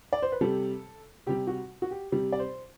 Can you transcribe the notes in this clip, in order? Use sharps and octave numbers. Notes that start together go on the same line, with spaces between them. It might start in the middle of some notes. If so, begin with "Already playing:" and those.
D5
C5
B4
C3 G3 A4
C3 G3 G4
F#4
F#4
G4
C3 G3
D5
C5